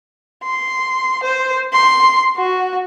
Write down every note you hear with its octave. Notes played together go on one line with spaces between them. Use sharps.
C6
C5
C6
F#4